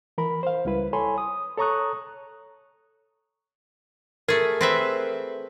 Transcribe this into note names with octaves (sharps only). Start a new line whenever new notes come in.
E3 A#4 B5
C5 F5
C#2 G3 E4 B4
A4 C#5 G#5 B5 C6
D#6
A4 C#5 A#5 C#6 D#6 F#6
A3 G#4 A#4
C4 B4 E5